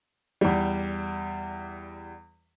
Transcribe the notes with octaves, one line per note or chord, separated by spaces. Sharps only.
E2 G3